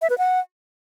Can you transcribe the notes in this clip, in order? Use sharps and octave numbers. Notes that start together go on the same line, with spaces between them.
E5
B4
F#5